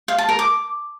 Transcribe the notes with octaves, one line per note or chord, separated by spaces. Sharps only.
F5
A5
A#4
D6